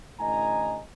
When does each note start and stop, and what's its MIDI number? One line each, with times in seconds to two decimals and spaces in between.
0.20 0.78 33
0.20 0.78 45
0.20 0.78 50
0.20 0.78 75
0.20 0.78 80
0.20 0.78 82